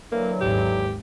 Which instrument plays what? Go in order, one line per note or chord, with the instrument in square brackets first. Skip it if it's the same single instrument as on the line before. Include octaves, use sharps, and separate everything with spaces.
[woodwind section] D3 E3 F#3 [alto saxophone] A#3
[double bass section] G#1 D#2 G#2 [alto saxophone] G4